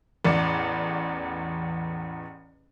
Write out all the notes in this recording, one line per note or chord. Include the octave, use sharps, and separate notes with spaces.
A1 E2 D5 C#7